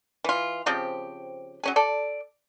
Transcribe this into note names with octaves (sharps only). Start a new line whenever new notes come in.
E3 F4
C#3 F3 C4 G4
F#3 C#4 G#4
A4 D5